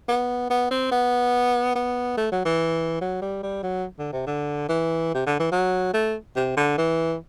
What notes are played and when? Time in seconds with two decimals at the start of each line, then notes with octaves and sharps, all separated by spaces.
0.08 B3
0.50 B3
0.71 C4
0.91 B3
1.75 B3
2.17 A3
2.32 F#3
2.45 E3
3.01 F#3
3.21 G3
3.43 G3
3.63 F#3
3.99 D3
4.13 C3
4.26 D3
4.68 E3
5.14 C3
5.26 D3
5.39 E3
5.52 F#3
5.93 A3
6.36 C3
6.57 D3
6.78 E3